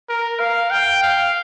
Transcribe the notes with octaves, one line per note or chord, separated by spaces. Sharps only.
A#4
F5
G5
F5